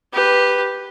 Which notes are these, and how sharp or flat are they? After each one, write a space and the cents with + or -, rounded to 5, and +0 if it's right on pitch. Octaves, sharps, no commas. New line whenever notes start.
G4 +0 B4 +0